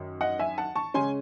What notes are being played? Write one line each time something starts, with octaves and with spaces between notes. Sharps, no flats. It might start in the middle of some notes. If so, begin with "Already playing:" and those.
Already playing: F#2 D#3
D#5 F#5
E5 G#5
F#5 A5
A5 C#6
C#3 G#3 C#4 G#5 C6